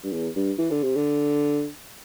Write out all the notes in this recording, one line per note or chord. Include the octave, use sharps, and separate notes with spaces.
G2
E2
G2
E3
D3
C3
D3